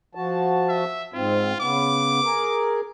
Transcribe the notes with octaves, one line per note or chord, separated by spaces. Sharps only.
F3 F#4 A5
E5
G#2 C4 F4
C#3 B3 D6
G#4 A#4